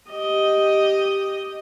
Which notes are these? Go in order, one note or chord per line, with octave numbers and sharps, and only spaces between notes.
G4 D#5